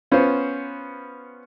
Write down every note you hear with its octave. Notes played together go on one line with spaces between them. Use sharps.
B3 C#4 F4 C5